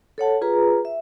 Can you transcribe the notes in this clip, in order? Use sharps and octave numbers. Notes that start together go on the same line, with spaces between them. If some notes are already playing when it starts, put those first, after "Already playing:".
A4 C#5 F#5 A5
F4 G#4 B4 A#5
E5